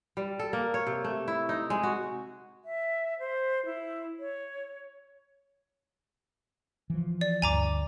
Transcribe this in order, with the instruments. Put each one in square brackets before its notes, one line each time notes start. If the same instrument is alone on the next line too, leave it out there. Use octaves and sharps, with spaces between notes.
[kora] G3
A4
A#3
C#5
C3
A3
E4
D#4
G#3
F#4
[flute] E5
C5
E4
C#5
[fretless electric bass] E3 F3
[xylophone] D5
[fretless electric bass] D2 G2 [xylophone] G#5 A#5 D6